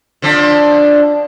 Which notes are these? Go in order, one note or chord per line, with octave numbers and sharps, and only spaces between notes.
D3 F3 D4